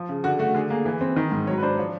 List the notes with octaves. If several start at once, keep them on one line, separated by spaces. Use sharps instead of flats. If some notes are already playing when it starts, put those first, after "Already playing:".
Already playing: F3
C#3
D3 F#4
A3 F#4
D3 G#4
A#3 G#4
E3
C4
D#3
G#2
F#3 C#5
B4
D4 C5
F3 C#5